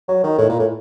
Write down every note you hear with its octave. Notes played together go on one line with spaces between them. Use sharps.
F#3
D#3
A2
A#2
A2